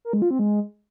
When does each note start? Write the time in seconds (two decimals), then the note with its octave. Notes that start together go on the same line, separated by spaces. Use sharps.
0.05 A#4
0.13 G#3
0.22 F4
0.31 C4
0.39 G#3